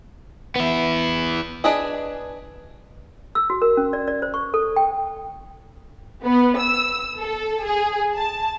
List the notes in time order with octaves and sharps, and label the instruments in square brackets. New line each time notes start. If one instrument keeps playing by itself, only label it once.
[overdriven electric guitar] B3 E4
[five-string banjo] D4 G#4 B4 D#5
[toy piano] E6
F#4
A#4
C#4
D5
D5
C5
C#6
A4
G5
[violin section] B3
E6
A4
G#4
A5